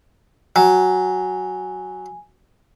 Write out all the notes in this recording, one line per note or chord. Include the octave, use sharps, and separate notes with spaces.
F#3 G#5